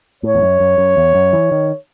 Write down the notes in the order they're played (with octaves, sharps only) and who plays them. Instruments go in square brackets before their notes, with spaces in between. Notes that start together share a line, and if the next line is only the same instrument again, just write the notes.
[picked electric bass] A2 [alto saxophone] C#5
[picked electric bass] E2
F#2
F#2
F#2
E2
F#2
E3
D#3